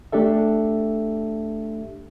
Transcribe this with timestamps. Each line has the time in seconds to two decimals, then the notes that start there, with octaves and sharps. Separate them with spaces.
0.12 A3 D4 G4 A4 E5